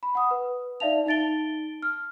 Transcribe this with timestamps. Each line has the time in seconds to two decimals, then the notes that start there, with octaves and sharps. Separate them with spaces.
0.03 B5
0.15 F#5 D#6
0.31 B4
0.80 D#4 D5 E5 F5 A5 F7
1.06 D#4 A5 A6 D7 G7
1.82 F6